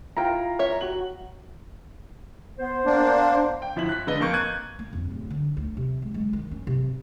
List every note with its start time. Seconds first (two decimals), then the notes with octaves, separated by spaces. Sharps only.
0.17 E4 F4 G5 A#5
0.59 C#5 E5
0.81 F#4 F#7
2.59 B3 C5
2.86 A#3 D4
3.62 G5
3.76 G1 F3 E4 E5 F#7
3.89 F#6 B6
4.07 D3 G#3 B4 D#5 G7
4.20 F2 A#3 C#6 G6
4.33 F#6 G#6 D#7
4.79 A#3
4.93 F2
5.11 D1
5.30 D3
5.57 D2
5.77 C3
6.02 G#3
6.14 G#3
6.33 D#3
6.51 C#4
6.67 C3